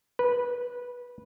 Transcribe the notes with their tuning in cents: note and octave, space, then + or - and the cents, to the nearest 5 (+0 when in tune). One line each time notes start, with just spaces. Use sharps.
B4 -15